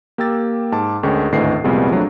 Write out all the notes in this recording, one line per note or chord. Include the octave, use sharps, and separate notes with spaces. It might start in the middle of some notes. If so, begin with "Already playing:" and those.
A#3 G4 G5 E6 A6
G#2 A5 D6
D2 G#3 C#4 A#4 G5 C#6
G#1 D2 A2 B4 D#5 C7
C2 F2 A#2 G3 G#3 B3
F3 F#3 A3 D4